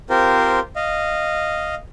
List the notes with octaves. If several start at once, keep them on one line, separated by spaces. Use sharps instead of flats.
C4 F4 G4 A#4 C5
D#5 F5